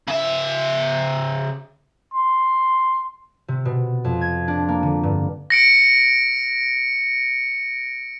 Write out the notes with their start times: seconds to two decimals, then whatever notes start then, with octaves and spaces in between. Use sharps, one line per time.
0.08 C#3 E5
2.14 C6
3.48 C3
3.65 B2
4.04 F2
4.21 G#6
4.48 D4
4.68 A#3
4.83 D3
5.03 G2
5.50 A#6 C#7 D7